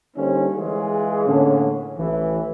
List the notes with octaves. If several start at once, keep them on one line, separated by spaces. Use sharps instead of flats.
D3 G3 A#3 C4 C#4 D#4
E3 G#3 F4 G#4
A2 D3 A#3 C#4
A1 E3